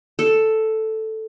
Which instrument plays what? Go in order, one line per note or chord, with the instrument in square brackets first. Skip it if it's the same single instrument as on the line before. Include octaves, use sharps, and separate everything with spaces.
[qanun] A4